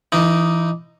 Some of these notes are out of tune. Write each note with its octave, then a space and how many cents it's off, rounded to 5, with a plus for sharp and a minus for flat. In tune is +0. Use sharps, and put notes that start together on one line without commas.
E3 +20 D#4 -5